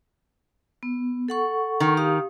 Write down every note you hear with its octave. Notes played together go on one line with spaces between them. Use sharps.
B3
A4 F#5 C#6
D#3
G4 F5 D#6